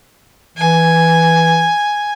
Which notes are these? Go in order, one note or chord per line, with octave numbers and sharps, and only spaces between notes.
E3 G#5